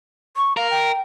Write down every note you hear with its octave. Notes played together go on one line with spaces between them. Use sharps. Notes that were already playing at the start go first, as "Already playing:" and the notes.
C#6
A#4 F5
G5